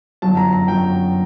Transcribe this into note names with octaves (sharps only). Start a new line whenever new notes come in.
G1 F#2 F#3 A5
A#5
A#5
G1 F#2 F#3 G5